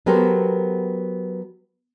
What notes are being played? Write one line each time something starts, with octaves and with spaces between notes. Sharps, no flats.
F#3 B3 G4 A4 A#4 C5